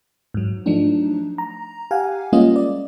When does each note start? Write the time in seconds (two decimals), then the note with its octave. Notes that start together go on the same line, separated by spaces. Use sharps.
0.34 G#2 F#3
0.66 F3 F#3 A3 D4 D#4
1.38 A#5
1.91 G4 F5 F#5 G#5
2.32 G3 G#3 A#3 C#4 F4 D#5
2.56 D5